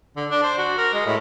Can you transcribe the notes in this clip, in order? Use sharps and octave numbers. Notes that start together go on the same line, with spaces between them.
D3
D4
C5
F#4
A#4
G#3
A2